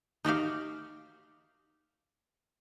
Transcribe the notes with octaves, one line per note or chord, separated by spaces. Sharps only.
D#4 F#4 G4 F5